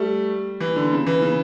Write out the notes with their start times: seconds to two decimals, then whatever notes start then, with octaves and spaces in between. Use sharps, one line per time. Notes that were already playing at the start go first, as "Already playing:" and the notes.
Already playing: G3 A3
0.60 E3
0.76 D3
0.92 C#3
1.07 E3
1.22 C#3